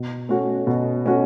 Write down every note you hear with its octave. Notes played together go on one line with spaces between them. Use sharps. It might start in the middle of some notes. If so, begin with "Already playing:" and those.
Already playing: B2
A3 C#4 F#4
B2
A3 C#4 F#4